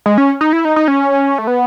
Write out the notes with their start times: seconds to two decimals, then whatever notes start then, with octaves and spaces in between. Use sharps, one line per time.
0.06 G#3
0.18 C#4
0.41 D#4
0.53 E4
0.65 D#4
0.76 D#4
0.88 C#4
1.38 A3
1.47 B3